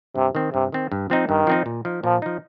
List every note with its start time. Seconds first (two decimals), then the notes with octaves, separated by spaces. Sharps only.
0.16 G2 C3
0.35 D#3 C4
0.54 G2 C3
0.72 D#3 C4
0.92 G2
1.10 F3 C4 D#4
1.29 G2 D#3
1.47 F3 C4 D#4
1.66 A#2
1.85 F3 D#4
2.04 A#2 F3
2.22 F3 D#4